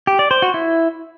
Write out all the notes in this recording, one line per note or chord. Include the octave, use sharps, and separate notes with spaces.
G4
D5
C5
F#4
E4